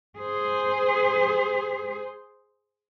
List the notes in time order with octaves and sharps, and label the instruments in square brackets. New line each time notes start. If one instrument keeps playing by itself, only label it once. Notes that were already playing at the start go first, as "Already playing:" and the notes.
[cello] G#4 C5